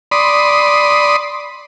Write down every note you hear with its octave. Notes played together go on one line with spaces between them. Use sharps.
D5 B5 C6 D#6